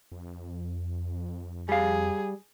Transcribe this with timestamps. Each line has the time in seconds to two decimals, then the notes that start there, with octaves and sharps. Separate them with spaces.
0.12 F2
1.69 G3 G#4 F5